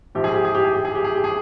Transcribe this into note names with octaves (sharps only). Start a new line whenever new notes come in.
A#1 G#2 F3 G4
G#4
G4
G#4
G4
G#4
G4
G#4
G4
G#4
G4
G#4